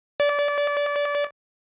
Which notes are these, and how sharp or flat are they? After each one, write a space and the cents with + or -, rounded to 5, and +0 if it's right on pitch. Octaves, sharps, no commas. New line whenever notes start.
D5 -25